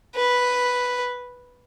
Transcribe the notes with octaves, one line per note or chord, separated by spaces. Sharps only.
B4